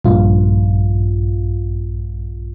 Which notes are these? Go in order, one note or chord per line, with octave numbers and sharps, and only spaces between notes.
A#1 G2 F4